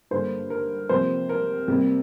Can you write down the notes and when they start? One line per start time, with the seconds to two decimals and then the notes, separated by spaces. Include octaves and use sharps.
0.11 G2 D3 A#3 C5
0.50 A#4
0.89 C3 F3 A#3 C5
1.29 A#4
1.68 C3 G3 A#3